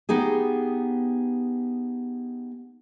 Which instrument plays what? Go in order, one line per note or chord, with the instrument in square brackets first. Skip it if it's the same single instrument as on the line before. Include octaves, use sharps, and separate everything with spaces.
[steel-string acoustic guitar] B3 D#4 G4 G#4